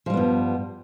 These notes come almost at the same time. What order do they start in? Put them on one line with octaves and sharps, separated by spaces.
F3 G3 B3 G2